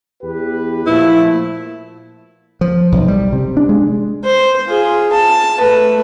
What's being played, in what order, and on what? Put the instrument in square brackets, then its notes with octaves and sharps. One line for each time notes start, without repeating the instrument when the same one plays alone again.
[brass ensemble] E2 G4 B4
[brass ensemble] A#2 F3 A3 [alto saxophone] E4
[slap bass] F3
B1
G3
C3
D4
G#3
[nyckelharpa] C5
F4 G#4
A5
A3 B4